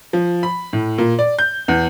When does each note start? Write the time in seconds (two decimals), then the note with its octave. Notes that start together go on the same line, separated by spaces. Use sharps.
0.13 F3
0.43 B5
0.73 A2
0.98 A#2
1.19 D5
1.39 G6
1.68 E2